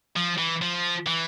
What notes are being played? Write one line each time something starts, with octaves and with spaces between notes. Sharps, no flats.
F3
E3
F3
E3